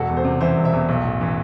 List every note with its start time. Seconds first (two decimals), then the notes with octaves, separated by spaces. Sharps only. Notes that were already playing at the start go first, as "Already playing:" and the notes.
Already playing: E1 F#4 A4
0.09 E2
0.17 A4 C5
0.25 C3
0.41 E3 C5 E5
0.57 E1
0.64 C5 E5
0.73 E2
0.88 B1
1.04 A2
1.21 E3